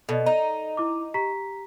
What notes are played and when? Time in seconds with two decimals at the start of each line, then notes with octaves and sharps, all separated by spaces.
0.09 B2 A4 D5 D#5
0.26 D#4
0.77 E4 D6
1.14 G4 A#5 B6